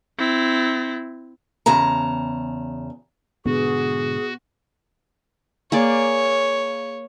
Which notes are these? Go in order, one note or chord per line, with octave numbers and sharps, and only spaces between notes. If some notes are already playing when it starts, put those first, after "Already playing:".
C4 E4
E2 C#3 A5 A#5
G#2 B2 D3 B3 F#4 G#4
A#3 G#4 C#5 D5